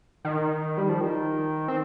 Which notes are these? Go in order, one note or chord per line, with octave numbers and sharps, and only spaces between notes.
D#3
G3
F3
D#3
C4